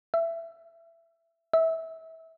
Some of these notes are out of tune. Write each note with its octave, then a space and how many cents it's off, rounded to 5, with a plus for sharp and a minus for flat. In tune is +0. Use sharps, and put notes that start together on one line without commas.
E5 +15
E5 -25